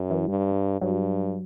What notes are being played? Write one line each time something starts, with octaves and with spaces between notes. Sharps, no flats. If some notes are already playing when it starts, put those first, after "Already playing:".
Already playing: F#2
E3
G2 G3
G2 F#3